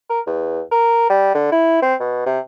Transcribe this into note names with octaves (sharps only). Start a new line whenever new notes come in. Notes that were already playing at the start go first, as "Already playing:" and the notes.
A#4
E2
A#4
G3
D3
E4
C4
B2
C3